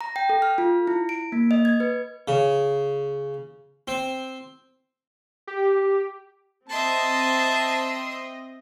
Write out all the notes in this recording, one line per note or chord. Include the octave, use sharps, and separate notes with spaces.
A#5
G5
A4
F6
F4
E4
D7
A#3
D#5
G#6
B4
C#3
C4
G4
C4 D#5 E5 A5 C6